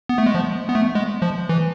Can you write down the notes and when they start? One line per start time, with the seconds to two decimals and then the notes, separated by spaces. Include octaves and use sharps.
0.09 B3
0.18 A3
0.26 G#3
0.35 F3
0.69 B3
0.75 A3
0.95 G#3
1.22 F3
1.49 E3